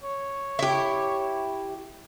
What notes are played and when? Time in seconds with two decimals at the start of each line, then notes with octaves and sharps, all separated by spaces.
0.03 C#5
0.59 E4 G4